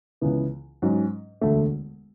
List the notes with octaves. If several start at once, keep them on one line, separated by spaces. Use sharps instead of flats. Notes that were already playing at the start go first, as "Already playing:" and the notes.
C#2 C#3 E3 B3
G#2 F#3 C#4
E1 D2 D3 A3